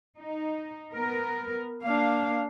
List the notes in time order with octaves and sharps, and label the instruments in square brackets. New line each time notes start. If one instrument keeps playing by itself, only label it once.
[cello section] D#4
B3 A#4
[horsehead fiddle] A#3 D4 [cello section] F5